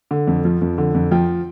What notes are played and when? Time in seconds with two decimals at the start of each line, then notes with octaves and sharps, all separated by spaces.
0.11 D3
0.27 F2
0.45 F3
0.61 F2
0.78 D3
0.95 F2
1.11 F3 G5